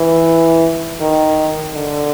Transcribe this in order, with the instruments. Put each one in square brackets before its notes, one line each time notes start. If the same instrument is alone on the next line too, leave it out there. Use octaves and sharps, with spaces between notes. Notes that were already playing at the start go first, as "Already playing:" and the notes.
Already playing: [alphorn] E3
D#3
D3